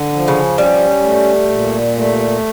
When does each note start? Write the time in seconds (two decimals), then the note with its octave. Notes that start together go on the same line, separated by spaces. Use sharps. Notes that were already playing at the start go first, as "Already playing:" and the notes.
Already playing: D3
0.12 F3
0.28 C#3
0.58 G3 C#4
1.03 A3
1.50 A#2
1.96 A3